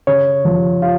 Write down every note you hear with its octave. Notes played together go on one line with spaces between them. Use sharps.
C#3 C#5
F3
F4